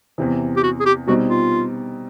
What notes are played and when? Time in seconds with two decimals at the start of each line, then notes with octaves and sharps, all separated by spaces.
0.18 E2 C3 E3
0.57 G4
0.63 F#4
0.80 G#4
0.86 G4
1.07 B2 G3 C4 D#4 F#4
1.30 F4